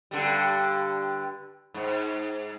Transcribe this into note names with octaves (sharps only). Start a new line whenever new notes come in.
G2 D3 G3
G#2